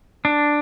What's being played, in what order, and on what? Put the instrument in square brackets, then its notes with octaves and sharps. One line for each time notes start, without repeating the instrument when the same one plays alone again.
[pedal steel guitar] D4